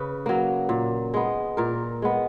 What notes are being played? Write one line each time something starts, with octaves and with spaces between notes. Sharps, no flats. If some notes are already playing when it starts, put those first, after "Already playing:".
Already playing: C#3 B4
F#3 A#3
A#2
G#3 B3
A#2 A#4
G#3 B3